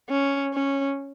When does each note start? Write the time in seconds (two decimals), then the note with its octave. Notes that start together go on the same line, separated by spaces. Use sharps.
0.09 C#4
0.54 C#4